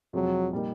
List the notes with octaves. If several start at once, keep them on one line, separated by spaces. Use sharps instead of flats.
F2 C3 F3 F#3 G#3
A#2 G3 A#3 D#4